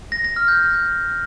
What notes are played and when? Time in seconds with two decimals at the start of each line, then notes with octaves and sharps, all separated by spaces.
0.12 A#6
0.24 A#6
0.36 F6
0.48 G6